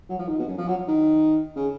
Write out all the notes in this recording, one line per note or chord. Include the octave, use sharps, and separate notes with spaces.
F#3
F3
D#3
B2
F#2
F3
F#3
D#3
C#3